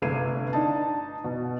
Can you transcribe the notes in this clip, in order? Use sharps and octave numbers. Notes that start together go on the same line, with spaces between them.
G1 C3 A3 G#6 C7 D#7
D4 D#4 A5
B2